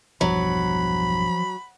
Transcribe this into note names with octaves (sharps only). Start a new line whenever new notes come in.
B1 E2 G2 F3 F#3 B5